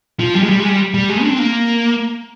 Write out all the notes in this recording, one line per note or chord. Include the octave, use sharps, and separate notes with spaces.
F3
G3
G#3
G3
G#3
G3
G3
G#3
D4
C4
A#3